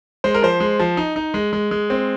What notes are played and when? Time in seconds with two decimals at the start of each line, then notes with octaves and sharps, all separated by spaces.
0.24 G#3 C5
0.34 A#4
0.42 F3 C5
0.60 G#3
0.79 F3
0.97 D#4
1.16 D#4
1.34 G#3
1.53 G#3
1.71 G#3
1.90 C4